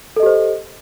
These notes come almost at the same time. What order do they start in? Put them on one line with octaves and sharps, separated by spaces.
A4 D#5 G4 C5